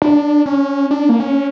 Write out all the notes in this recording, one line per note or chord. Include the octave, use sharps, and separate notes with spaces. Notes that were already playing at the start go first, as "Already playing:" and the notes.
D4
C#4
D4
A#3
C#4